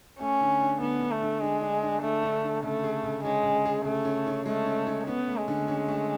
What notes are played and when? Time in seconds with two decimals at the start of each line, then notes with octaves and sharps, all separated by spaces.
0.20 A3 C#4
0.41 D3
0.61 D4
0.80 D3 B3
1.01 D3
1.11 A3
1.22 D3
1.42 G#3 D4
1.61 D4
1.82 D4
2.02 D3 A3
2.23 D3
2.43 D3
2.63 C#3 A3
2.84 G#4
3.04 C#3
3.24 G#3 C#4
3.44 C#3
3.65 G#4
3.85 C#3 A3
4.05 C#4
4.26 C#4
4.46 G#3 A3
4.66 C#4
4.87 C#4
5.07 B3 C#4
5.28 A3
5.37 G#3
5.48 D3
5.68 C#4
5.88 A3